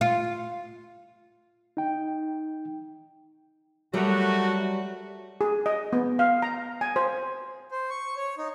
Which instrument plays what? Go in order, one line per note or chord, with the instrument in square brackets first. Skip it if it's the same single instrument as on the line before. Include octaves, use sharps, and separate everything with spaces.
[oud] F4
[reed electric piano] D#4 G5
[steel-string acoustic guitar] F#3 G3 A#4 [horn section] A3 F#4
[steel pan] G#4
D#5
B3
F5
A#5
G#5
C5
[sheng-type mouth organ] C5
C#6
C#5
D#4